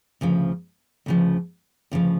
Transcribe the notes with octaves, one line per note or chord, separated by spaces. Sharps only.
D2 C#3 F3
D2 C#3 F3
D2 C#3 F3